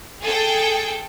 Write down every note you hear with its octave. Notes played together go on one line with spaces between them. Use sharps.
G#4 A4 G5